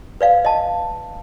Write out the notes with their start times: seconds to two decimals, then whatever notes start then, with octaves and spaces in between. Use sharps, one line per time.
0.21 B4 D5 F5
0.45 D#5 A5